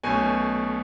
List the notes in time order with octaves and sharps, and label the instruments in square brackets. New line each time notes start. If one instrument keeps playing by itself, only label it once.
[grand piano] B1 B2 A3 C#4 G#5